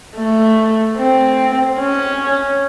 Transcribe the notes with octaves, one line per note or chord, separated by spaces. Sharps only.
A3
C4
C#4